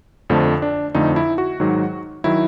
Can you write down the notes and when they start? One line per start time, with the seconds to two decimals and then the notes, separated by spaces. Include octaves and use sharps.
0.30 F2 D3 F3 A3
0.62 D4
0.95 F2 D3 F3 A3 D#4
1.16 E4
1.38 F#4
1.60 G#2 D#3 F#3
2.24 D#3 F#3 E4